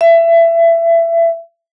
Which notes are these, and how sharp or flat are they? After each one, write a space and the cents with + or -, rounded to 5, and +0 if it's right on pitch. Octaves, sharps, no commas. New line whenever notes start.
E5 +25